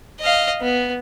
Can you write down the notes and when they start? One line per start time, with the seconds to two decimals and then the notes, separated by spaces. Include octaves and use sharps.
0.21 D#5 F5
0.62 B3